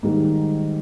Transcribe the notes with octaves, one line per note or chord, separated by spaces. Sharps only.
G#2 D#3 G3 A#3 D#4